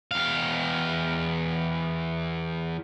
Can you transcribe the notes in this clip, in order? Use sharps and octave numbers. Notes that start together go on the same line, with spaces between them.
E2 F5